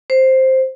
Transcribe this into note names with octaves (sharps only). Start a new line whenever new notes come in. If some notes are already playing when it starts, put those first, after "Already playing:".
C5